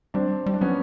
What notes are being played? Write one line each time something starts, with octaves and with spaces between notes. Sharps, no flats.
G3 C4 D4
G3
D4
F#3 B3 C#4